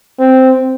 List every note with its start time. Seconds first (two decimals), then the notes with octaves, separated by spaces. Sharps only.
0.19 C4